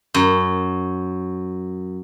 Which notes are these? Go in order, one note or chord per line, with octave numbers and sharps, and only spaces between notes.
F#2